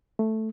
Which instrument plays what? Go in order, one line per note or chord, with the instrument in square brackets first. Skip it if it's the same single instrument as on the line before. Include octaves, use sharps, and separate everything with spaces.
[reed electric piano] A3